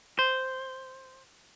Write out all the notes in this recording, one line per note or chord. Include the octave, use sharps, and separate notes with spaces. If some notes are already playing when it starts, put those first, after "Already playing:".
C5